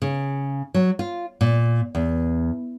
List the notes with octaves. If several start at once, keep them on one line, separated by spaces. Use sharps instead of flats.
C#3
F#3
F4
A#2
E2